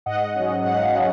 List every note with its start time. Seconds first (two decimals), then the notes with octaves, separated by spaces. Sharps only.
0.06 G#2 D#5 F#5
0.35 F#3 C#4
0.65 G#2 F#5
0.76 F5
0.86 D#5 F#5
0.95 F#3 C#4